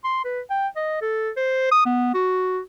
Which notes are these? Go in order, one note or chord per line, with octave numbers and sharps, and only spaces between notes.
C6
B4
G5
D#5
A4
C5
D#6
B3
F#4